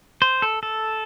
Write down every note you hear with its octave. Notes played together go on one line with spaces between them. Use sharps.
C5
A4
A4